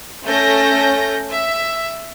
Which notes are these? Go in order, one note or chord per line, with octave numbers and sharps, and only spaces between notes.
A3 C#4 G6 A#6
E5